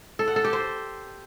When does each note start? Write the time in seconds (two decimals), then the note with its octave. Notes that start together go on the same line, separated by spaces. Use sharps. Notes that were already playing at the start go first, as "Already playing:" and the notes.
0.19 A4
0.28 F#5
0.36 A4
0.44 G4
0.53 C5